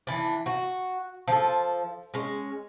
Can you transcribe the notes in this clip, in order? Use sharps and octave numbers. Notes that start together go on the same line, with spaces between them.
E3 D4
F#4
F3 A4
G#3 C#4